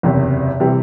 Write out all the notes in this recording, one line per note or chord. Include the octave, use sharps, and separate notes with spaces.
F#1 E2 C3
C3 E3 G3